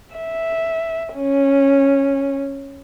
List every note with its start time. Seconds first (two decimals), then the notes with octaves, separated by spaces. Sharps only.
0.15 E5
1.15 C#4